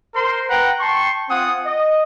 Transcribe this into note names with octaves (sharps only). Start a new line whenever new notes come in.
A#4 C5 C6
B4 F#5 G5 A#5
G5 A5 C6 C#6
C4 F4 F#5 G#5 D#6
D#5